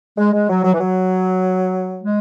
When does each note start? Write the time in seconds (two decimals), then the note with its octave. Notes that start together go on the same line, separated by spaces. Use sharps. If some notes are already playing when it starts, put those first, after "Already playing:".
0.18 G#3
0.33 G#3
0.49 F#3
0.64 F#3
0.74 E3
0.80 F#3
2.03 G#3